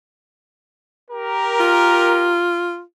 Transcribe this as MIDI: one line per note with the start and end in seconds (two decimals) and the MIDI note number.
1.10 2.46 67
1.10 2.46 70
1.60 2.81 65